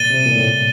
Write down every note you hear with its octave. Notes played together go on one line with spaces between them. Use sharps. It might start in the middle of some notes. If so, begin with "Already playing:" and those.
Already playing: A#2 A6 D#7 G7
C3
A#2
A2